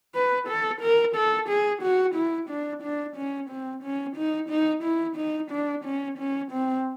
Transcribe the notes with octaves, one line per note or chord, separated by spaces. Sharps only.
B4
A4
A#4
A4
G#4
F#4
E4
D4
D4
C#4
C4
C#4
D#4
D#4
E4
D#4
D4
C#4
C#4
C4